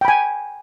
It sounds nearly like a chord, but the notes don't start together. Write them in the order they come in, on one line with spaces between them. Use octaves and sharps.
G5 B5 G#5